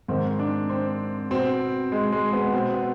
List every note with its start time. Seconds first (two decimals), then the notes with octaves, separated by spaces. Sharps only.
0.08 G#2 D#3 C4
0.39 D4
0.69 C4
1.31 B2 C4
1.92 G#3
2.12 G#3
2.33 B3
2.53 B2 C4
2.74 B3